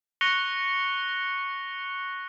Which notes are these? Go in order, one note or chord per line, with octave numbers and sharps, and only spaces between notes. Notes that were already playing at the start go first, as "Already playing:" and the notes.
C#6 F#6 A#6 C#7 F7 G7